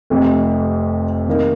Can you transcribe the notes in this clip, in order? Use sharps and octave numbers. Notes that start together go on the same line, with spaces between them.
F1 F2 C3
C3 D#3 A#3 D#4